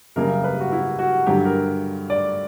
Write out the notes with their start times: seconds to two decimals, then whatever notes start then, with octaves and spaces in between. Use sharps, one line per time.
0.16 F#2 C#3 G3 A#3 A#4
0.44 B4
0.60 F#4
0.72 E4
0.99 F#4
1.26 G2 D3 F#3 G4
1.45 A#4
2.10 D5